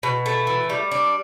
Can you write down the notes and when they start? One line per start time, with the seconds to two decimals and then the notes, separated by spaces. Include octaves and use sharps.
0.03 B2
0.26 A3
0.47 E3
0.70 G3
0.91 D4